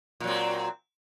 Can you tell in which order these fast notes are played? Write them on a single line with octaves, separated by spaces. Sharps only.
A#2 F#3 C4